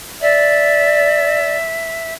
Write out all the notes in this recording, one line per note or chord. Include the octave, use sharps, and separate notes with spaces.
D5 E5